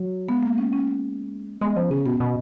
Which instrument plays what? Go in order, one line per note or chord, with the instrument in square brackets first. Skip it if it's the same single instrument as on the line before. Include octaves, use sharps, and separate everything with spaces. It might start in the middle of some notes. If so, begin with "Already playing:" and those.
Already playing: [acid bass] F#3
[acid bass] G#3 [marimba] B3
[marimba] A#3
C#4
C#4
[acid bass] G#3 [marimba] B3
[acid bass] F3 [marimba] C#4
[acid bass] C#3 [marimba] C#4
[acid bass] B2 [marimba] B3
[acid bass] B2